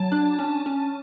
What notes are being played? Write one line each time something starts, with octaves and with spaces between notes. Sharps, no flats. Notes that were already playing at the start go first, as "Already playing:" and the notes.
Already playing: F#3 A5
D4
C#4
C#4